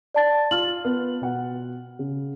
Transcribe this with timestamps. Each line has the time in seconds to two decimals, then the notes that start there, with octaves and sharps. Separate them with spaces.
0.15 D5 A5 A6
0.51 F4 F6 F#7
0.85 B3
1.21 B2 F#5
1.99 C#3